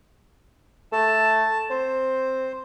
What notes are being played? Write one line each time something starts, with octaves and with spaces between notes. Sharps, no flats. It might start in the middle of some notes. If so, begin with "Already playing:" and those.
A3 A5
C4 C5